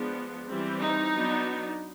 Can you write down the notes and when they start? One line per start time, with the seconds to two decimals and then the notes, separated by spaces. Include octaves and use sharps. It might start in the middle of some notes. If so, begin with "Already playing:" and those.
Already playing: F3 G#3 B3 D4
0.49 E3 G3 C4
0.81 D#4
1.12 F#3 B3 D4